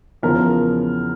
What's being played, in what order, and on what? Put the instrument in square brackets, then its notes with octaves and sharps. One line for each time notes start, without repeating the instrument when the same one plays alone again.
[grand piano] E2 C#3 F3 A#4